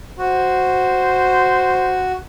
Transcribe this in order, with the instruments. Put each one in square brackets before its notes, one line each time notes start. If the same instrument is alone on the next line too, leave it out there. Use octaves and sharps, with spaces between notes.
[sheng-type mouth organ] F#4 [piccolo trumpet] C5